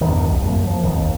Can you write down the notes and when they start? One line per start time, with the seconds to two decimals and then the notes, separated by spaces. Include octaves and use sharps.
0.01 E2 G2 D#3
0.31 C2 F2
0.45 F#2 A#3
0.66 F3
0.83 G#1 F2 D#3
0.98 D#2